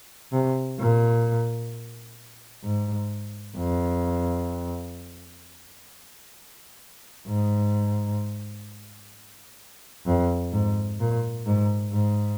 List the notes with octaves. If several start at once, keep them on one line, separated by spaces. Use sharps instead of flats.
C3
A#2
G#2
F2
G#2
F2
G#2
A#2
G#2
G#2